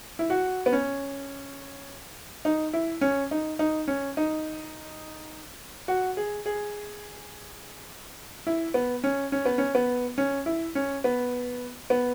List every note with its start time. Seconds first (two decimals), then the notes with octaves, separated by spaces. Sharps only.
0.19 E4
0.30 F#4
0.66 B3
0.72 C#4
2.45 D#4
2.73 E4
3.01 C#4
3.31 D#4
3.59 D#4
3.88 C#4
4.17 D#4
5.88 F#4
6.17 G#4
6.46 G#4
8.47 E4
8.74 B3
9.04 C#4
9.32 C#4
9.45 B3
9.58 C#4
9.75 B3
10.18 C#4
10.46 E4
10.75 C#4
11.04 B3
11.90 B3